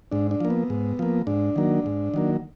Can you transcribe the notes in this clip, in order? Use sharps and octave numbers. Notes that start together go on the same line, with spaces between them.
G#2 D4
D4
F3 A#3
B3
G#2
F3 A#3
G#2 D4
D#3 F#3 A#3
G#2
D#3 F#3 A#3